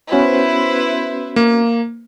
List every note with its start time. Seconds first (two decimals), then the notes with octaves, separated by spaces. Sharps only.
0.12 B3 C#4 E4 F#4 B4 C5
1.36 A#3